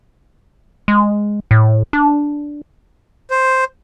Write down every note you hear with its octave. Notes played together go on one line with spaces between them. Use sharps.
G#3
A2
D4
C5